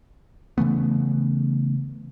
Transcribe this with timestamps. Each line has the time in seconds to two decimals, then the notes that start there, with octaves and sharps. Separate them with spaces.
0.58 C#3 E3 A3 B3